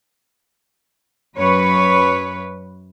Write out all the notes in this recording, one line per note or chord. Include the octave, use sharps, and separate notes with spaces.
F#2 B4 C#5